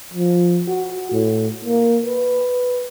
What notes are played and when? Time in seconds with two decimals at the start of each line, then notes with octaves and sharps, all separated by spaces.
0.14 F3
0.68 F#4
1.12 A2
1.65 A#3
2.06 B4